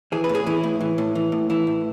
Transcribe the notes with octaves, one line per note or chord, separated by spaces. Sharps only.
E3 G#4
B4
A2
G#4
E3 E4
A2
E3
A2
E3
A2
E3 E4
A2